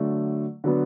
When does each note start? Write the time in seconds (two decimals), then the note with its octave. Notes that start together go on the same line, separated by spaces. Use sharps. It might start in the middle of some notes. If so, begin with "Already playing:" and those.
Already playing: D3 F#3 A3
0.64 D3 F#3 B3